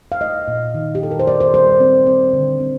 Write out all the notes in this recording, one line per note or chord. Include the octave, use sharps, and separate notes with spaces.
F5
A3 D#5
A#2
D#3
G4
A#3 A4
A#4
C5
A#3 D5
C5
G3 C5
C4
C4
D3
C4